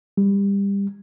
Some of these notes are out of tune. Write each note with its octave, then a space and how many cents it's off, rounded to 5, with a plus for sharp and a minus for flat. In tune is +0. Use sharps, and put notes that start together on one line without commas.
G3 +25